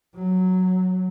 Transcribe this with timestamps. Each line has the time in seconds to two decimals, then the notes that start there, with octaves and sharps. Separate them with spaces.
0.14 F#3